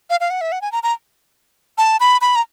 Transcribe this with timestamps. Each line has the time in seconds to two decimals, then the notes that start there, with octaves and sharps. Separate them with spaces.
0.10 F5
0.20 F5
0.30 F#5
0.41 E5
0.52 F#5
0.62 G#5
0.72 A#5
0.83 A#5
1.78 A5
2.00 B5
2.21 B5
2.36 A#5